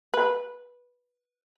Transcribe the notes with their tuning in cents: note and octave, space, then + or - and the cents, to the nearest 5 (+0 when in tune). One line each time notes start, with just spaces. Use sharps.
B4 -15